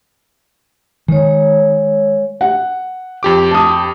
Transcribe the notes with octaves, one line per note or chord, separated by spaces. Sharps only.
D#3 G#3 C#5
F#5
F2 G4 D6
A5 D#6